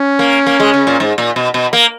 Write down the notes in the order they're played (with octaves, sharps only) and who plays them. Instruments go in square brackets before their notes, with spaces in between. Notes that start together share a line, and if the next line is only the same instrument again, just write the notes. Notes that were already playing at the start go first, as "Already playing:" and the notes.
Already playing: [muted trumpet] C#4
[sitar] A#3
A#3
G#3
C#3
A#2
G#2
A#2
B2
B2
A#3